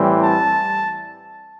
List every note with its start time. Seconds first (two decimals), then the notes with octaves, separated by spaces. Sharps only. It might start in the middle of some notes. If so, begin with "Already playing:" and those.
Already playing: A2 E3 G3 C4
0.22 A5